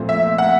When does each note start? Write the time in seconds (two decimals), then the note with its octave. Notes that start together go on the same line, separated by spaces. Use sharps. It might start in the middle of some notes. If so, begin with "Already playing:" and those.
Already playing: A#2 F3 A3 C4
0.09 E5
0.38 F#5